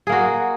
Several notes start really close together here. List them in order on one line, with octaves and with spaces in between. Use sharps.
G#4 A#3 F#4